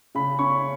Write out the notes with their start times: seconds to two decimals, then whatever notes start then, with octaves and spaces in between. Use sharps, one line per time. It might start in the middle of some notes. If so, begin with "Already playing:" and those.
0.15 C#3 B5
0.39 C#4 C#6